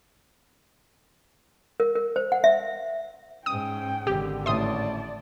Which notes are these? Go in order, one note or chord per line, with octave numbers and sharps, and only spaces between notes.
A#4
A#4
C5
F#5
E5
G#2 C#4 G5 D#6
G#1 D3 G4
A1 D5 E5 A5 C6 D#6